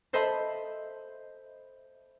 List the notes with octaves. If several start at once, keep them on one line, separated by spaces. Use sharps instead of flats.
A4 C5 D#5 E5 A5 B5